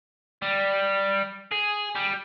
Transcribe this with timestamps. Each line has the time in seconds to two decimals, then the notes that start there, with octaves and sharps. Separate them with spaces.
0.42 G3
1.51 G#4
1.95 G3